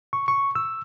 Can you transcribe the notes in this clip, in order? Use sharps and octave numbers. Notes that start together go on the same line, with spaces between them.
C#6
C#6
E6